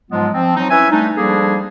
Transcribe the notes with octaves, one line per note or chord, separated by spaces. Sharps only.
G#2 F3 F#3 G#3 B3 F4
F3 C4
F3 F#3 C4 D#4
C#4 E4 B4 E5 G#5
G3 A3 D4 D#4
F3 G3 A#3 D4 G#4 A4